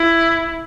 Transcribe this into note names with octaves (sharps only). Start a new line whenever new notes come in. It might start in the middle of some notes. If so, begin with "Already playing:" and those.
Already playing: E4